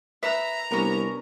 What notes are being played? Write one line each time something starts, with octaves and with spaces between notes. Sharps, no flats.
B4 E5 A#5 F#6
C2 B3 C#4 D4 A#4